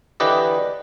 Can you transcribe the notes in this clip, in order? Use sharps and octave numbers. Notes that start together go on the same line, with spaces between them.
D3 E3 G4 B4 D5 D#5